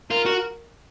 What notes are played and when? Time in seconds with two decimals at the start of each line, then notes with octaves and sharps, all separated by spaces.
0.10 F4 A#4
0.26 F#4